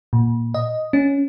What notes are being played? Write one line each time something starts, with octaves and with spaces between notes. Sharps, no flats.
A#2
D#5
C#4